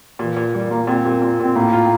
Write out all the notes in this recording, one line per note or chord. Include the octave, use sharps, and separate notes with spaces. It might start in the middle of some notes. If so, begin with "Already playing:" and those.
A#2 E3
A#2
A#2 G3
A#2 A#3
A#2 C4
A#2
A#2
A#2 C4
A2 A#3
F4